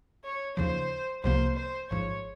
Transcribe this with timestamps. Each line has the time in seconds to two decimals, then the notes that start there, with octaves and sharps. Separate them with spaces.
0.24 C#5
0.57 D#2 C#3 F3 C5
1.24 C2 C3 F3 A#3 C5
1.57 C5
1.90 G#1 G#2 F3 C#5